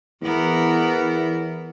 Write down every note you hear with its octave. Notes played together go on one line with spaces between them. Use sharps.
E2 E3 B3 A#4